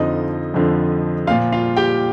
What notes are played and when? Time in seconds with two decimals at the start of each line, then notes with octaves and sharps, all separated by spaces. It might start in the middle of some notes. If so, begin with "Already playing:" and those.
Already playing: F2 D3 F3 D#4 D#5
0.54 F2 D3 F3
1.27 A#2 F3 F4 F5
1.52 F4 F5
1.77 G4 G5